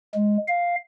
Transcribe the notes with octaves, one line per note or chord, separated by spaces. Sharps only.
G#3
F5